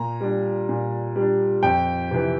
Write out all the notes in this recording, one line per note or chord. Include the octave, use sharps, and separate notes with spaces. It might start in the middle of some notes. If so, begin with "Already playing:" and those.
Already playing: A#2 A#5
G3 D4
A#2
G3 D4
F2 G5
C3 E3